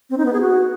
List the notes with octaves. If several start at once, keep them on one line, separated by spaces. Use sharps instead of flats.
C4
D#4
B3
G#4
F#4